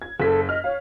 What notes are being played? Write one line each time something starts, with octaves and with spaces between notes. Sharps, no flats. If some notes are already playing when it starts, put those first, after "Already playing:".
G#6
F#1 A4 B6
D#5 F6
C#5 F5